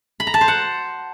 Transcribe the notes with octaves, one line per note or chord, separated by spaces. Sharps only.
B5
A#5
A5
C5
F#5